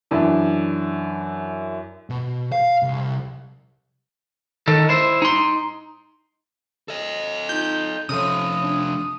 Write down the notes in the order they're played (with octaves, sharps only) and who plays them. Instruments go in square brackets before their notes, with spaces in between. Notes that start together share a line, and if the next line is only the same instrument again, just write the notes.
[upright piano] F#2 E3 D4 E4
[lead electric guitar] B2
F5
C2
D#3 A4
E4 C5
D#4 C6
A4 D#5
[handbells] D#4 F4 [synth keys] G6
[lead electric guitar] C3 F3 [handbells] C#4 A4 C#5 [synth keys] D#6
[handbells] D4